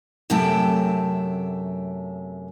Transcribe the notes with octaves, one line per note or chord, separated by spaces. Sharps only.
F#2 C3 F#3 A3 G5 A5